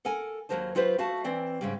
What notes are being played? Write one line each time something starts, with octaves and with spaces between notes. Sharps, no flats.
A4 A#4 F#5 G#5
D#2 F3 F#3 A#4 C5 A5
F#3 F4 G4 B4 C5
A3 F#4 E5 F5 A5
E3 C4 D5
G#2 C#3 G3